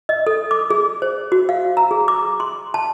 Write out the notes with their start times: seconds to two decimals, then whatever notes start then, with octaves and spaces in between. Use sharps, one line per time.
0.09 D#5
0.27 A4
0.51 D6
0.70 G#4
1.02 C5
1.32 F#4
1.49 F5
1.77 A#5
1.91 G#4
2.08 D6
2.40 C6
2.74 A5